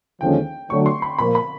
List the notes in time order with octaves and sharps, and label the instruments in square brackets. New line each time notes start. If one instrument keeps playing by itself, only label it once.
[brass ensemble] D#2 D3 F3 G#3 C#4 [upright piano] G5
[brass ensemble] D3 F#3 A3 D4 [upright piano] C#6
[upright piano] C6
B5
[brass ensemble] A#2 F3 A#3 [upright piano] B5
[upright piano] B5